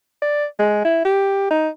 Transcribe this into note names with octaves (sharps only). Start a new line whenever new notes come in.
D5
G#3
E4
G4
D#4